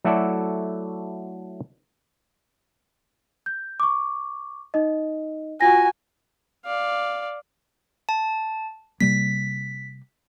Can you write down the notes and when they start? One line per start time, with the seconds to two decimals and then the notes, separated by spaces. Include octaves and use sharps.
0.04 F#3 A3 E4 F#4 A4 D5
3.46 G6
3.80 C#6 D6
4.74 D#4 D#5
5.61 F4 F#4 G#5 A#6
6.65 D5 F5
8.09 A5
9.01 C3 G3 A#3 B6